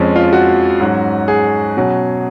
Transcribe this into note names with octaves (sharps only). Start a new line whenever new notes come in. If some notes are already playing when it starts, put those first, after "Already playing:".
Already playing: F2 F3 G#3 C#4
F4
F#4
G#2 F#3 C#4
G#4
B2 F#3 C#4